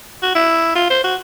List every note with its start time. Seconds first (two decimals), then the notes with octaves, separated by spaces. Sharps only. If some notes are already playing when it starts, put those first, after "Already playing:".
0.23 F#4
0.35 E4
0.76 F4
0.90 C5
1.04 F#4